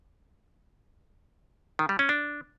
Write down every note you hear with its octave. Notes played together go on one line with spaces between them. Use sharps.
D#3
G3
C#4
D4